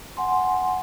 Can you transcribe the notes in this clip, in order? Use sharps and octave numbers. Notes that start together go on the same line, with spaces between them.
F#5 G#5 C6